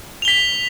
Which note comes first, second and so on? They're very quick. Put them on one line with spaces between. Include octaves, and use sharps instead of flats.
F7 G7 B6